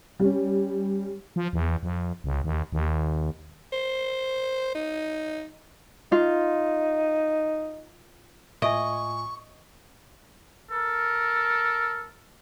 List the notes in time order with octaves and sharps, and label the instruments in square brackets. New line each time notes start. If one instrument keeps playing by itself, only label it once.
[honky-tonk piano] G3 C#4
[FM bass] F3
E2
F2
C#2
D#2
D#2
[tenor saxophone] C5
D#4
[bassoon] D#4 [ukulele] F4
[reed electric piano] A2 F4 G#5 [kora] D#5 [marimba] E5 [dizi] C#6
[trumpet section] A4 A#4